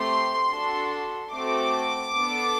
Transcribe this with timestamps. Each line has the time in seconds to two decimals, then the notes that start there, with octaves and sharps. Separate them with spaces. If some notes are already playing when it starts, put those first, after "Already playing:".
Already playing: A3 C4 G4 C6
0.51 D4 F#4 A4
1.32 A3 C4 F#4 A4 D6
2.15 B3 D4 A4